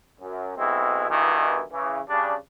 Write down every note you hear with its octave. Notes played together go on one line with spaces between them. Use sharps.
F#2
B1 B2 G#3 C4 E4
G2 B2 D#3 E3
C#3 E3
C#3 G3 D4